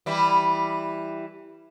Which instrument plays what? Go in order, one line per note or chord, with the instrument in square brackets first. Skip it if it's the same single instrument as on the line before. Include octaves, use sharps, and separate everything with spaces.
[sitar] E3 G3 E4